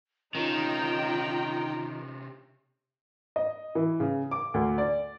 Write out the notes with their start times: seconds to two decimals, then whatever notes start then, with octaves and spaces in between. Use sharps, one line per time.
0.35 C3 D#3 C#4 D#4 F4 G5 A#5
3.36 D#5
3.75 E3
4.00 C#3
4.31 D6
4.54 D2
4.78 D5